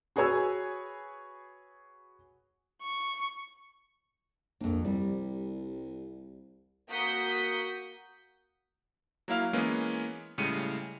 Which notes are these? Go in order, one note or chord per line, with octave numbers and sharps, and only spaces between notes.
F#4 G#4 B4 C#5 G#5 E6
C#6
A#1 F2 A#3
C2 G3
A#3 F#4 D#6 G6 B6 C#7
F#3 A#3 E4 F5 F6
E3 G#3 A#3 B3 C#4
A2 C#3 G3 G#3 C#7 D#7